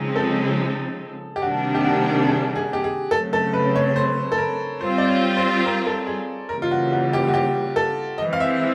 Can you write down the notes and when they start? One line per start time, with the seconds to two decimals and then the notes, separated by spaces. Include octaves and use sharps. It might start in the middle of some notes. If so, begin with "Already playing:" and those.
Already playing: C#3 F3 G#3 C4 D#4 G#4
0.16 A4
1.36 G4
1.42 C3 D#3 G3 A#3 D4 F#4
1.75 G4
1.84 F#4
2.27 G#4
2.56 G#4
2.73 G4
2.84 G#4
3.11 C#3 F#3 A3 C4 A4
3.33 A4
3.53 B4
3.76 C#5
3.96 C5
4.32 A4
4.38 A#4
4.81 G3 C4 F4 C5
4.98 D5
5.08 C#5
5.37 C5
5.65 A#4
5.87 A4
6.07 G#4
6.49 C#3 E3 G3 A#3 A#4
6.62 F4
6.71 F#4
6.92 F#4
7.13 G4
7.28 F#4
7.34 G4
7.76 A4
8.18 E3 G#3 C4 D#5
8.33 F5
8.40 E5